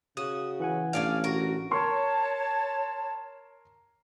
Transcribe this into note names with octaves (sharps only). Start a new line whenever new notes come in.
C#3 F#4 D#6
E3 F#5 G#5
A1 C#4 D4 D5 F5
F#4 A#4
A#4 C#5 A5 C6 C#6